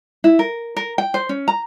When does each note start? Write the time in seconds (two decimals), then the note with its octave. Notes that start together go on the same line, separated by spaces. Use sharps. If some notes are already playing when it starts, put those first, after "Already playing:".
0.24 E4
0.39 A#4
0.77 A#4
0.98 G5
1.14 C5
1.29 C#4
1.48 A#5